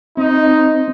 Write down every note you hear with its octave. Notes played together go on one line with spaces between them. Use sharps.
C4 D#4